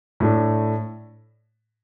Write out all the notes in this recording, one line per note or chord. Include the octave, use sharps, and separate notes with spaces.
A2 A3 D4